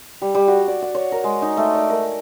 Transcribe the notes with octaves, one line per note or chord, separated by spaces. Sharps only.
G3
G3
F#4
D5
F#5
C#5
A#4
G#3
D#4
A3
D5
A#4